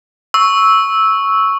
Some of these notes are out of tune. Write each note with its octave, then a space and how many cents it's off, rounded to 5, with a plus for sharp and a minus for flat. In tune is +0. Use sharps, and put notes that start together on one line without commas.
C#6 +0 E6 -10